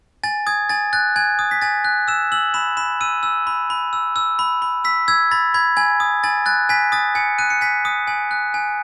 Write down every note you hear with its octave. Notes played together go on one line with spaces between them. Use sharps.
G#5 A6
D#6 G#6
G#5 A6
F#6 A6
G#5 G#6
D#6
B6
G#5 A6
F#6
E6 E7
E6 F#7
B5 E7
B5 E7
E6 D#7
E6
B5
B5
E6
E6
B5
B5
E6 B6
E6 G#6
B5 A6
B5 G#6
G#5 G#6
D#6
G#5 A6
F#6 A6
G#5 B6
D#6 A6
G#5 C#7
F#6 D#7
C#7
G#5 B6
D#6
G#5
F#6
G#5